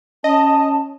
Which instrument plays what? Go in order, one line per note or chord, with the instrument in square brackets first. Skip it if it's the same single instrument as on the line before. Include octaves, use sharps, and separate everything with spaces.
[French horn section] C#4 [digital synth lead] D#5 [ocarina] A5